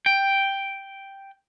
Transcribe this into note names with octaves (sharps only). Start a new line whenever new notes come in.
G5